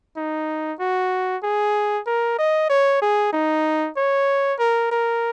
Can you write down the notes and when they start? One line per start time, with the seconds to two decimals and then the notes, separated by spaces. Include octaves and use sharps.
0.17 D#4
0.80 F#4
1.43 G#4
2.06 A#4
2.39 D#5
2.70 C#5
3.02 G#4
3.32 D#4
3.97 C#5
4.59 A#4
4.91 A#4